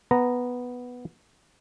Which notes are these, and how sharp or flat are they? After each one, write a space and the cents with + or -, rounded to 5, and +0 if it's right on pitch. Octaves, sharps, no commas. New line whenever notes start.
B3 +0 A#5 -5